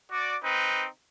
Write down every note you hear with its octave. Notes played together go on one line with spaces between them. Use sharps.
F#4 D5
C4 D#4 B4